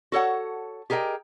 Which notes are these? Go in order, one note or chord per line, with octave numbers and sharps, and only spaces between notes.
F#4 A4 C#5 F#5
G4 G#4 A#4 D#5 G5